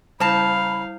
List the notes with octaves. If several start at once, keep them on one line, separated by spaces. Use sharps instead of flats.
C#3 G3 E4 F5 A5 B5